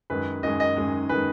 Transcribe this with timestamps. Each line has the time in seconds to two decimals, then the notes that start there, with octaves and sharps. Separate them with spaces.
0.10 F#2 D#3 G#3 B4
0.43 F#2 D#3 G#3 D#5
0.60 D#5
0.77 F#2 D#3 G#3
1.09 D#3 G#3 B4